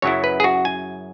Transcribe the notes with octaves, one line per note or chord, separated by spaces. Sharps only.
F#2 C#3 F#3 E4 C#5
B4
G#4
F#4
G#5